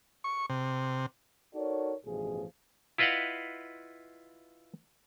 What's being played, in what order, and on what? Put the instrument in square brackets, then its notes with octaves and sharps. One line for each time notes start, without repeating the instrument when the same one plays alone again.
[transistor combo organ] C#6
C3
[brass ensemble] D#4 F#4 A4 A#4 C#5 D5
A1 G2 B2 F3 G#4
[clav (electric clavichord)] E4 F4 B4 D#5 F5 F#5